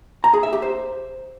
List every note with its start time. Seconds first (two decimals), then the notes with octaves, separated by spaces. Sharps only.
0.24 A#5
0.34 G#4
0.43 E5
0.53 G4
0.62 C5